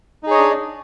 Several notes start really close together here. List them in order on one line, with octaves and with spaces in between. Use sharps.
D#4 G#4 C#5 D#5 D4